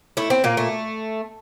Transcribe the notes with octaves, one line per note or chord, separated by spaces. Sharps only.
A3 E4
C4
A#2 A#3
A3